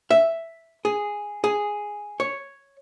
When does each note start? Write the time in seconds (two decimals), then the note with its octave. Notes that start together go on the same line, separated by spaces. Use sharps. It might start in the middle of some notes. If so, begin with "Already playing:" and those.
0.11 E5
0.85 G#4
1.44 G#4
2.20 C#5